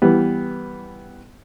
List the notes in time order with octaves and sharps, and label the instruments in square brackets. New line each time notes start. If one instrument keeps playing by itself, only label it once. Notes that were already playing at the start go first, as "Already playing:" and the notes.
[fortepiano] E3 G3 B3